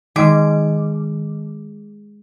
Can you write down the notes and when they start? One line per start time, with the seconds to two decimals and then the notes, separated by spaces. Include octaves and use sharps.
0.16 D#3 G#3 D6